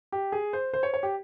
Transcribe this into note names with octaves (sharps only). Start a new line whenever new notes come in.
G4
G#4
C5
C5
C#5
C#5
G4